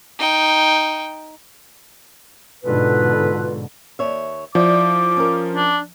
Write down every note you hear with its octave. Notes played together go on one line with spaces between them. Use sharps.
D#4 G5
G#2 B2 D3 F4 A4 B4
D#2 C#5 E5
F3 E4 D5 G5 D6
C#4 A#4
D4